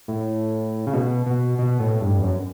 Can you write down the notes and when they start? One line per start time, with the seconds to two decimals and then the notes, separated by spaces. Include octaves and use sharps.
0.08 A2
0.87 C#3
0.94 B2
1.26 B2
1.58 B2
1.79 A2
2.01 G2
2.19 E2
2.23 F#2